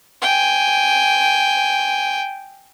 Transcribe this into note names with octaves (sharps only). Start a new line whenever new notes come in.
G5 G#5